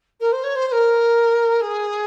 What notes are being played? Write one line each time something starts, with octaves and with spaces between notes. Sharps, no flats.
A#4
C5
C#5
C5
C5
A#4
G#4